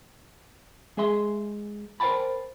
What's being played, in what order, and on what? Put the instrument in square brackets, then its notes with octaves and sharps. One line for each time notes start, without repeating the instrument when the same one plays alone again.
[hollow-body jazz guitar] G#3 G#4 E5 C6
A#4 C5 D5 G5 A5 B5